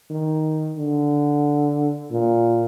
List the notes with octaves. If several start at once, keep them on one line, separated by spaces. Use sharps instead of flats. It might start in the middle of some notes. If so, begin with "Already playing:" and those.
D#3
D3
A#2